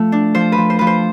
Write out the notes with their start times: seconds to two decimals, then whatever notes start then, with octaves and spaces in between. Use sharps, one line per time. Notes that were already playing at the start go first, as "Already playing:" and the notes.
Already playing: F3 A3
0.12 D4
0.35 F3 C5
0.52 B4
0.58 F3
0.70 C5
0.79 F3 B4
0.87 C5